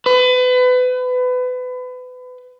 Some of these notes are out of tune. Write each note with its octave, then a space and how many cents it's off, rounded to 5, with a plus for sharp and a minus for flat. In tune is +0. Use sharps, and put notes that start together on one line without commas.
B4 +30